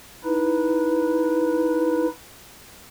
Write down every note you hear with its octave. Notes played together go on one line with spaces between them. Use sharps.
D#4 E4 B4